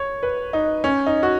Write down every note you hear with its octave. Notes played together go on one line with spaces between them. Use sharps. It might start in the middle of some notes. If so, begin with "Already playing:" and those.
Already playing: C#5
B4
D#4
C#4
D#4
F#4